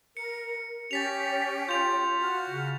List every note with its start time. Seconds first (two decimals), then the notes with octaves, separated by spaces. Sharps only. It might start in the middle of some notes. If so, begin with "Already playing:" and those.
0.17 A#4 C#7
0.91 C#4 G4 A6 B6 F7
1.69 F4 G6 F7
2.20 F#4 F6
2.50 C#3